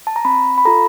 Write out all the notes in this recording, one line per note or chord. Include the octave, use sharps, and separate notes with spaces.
A5
A#5
C4 B5
B5
F4 A4 A#5